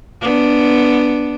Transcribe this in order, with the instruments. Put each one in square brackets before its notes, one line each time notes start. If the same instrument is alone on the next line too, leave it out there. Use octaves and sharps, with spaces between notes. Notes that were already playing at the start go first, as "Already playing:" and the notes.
[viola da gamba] B3 D4